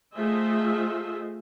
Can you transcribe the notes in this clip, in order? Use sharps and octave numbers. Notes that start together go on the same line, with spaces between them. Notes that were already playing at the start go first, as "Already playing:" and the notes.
A3 F4 G#4 C5 D#5 E5